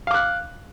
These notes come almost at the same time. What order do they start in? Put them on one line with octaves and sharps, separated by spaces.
F5 D6 F#6